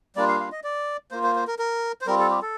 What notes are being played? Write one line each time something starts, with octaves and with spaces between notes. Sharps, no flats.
G3 A#3 D4 F4 D5
F5
F5
D#5
D5
A#3 F4 C5
C5
C5
A#4
A#4
C5
G3 C4 F4 A#4
A4
G4
A4